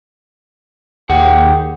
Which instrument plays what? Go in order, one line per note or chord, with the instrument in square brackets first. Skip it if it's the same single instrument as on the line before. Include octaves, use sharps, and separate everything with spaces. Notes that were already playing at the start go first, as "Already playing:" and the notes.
[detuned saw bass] D#2 [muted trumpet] G4 [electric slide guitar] G#4 F#5